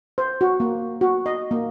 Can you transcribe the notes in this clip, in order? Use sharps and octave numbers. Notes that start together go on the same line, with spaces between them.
C5
F#4
A#3
F#4
D#5
A#3